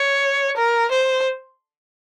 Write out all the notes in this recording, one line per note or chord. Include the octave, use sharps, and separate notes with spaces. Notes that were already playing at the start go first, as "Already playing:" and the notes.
Already playing: C#5
A#4
C5